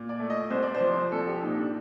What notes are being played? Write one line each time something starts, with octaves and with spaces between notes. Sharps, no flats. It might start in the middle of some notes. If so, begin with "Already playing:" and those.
Already playing: A#2
D5
A3
D#5
C2 C5
D5
C5
F3
C2 A4
G4
A#2 D#4
D4